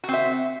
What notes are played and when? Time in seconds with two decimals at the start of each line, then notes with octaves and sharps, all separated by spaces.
0.04 F#4
0.09 C4
0.14 E5